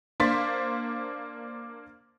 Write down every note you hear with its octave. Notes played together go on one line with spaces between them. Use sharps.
A#3 D4 C5 C6 A6 B6